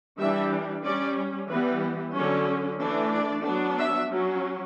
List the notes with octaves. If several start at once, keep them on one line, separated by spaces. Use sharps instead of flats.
E3 G3 D4 E5
G3 C#4 D5
E3 G3 B3 B4
D3 F#3 C#4 C#5
E3 A3 D4
D5
F#3 B3 D4
E5
F#3 C#4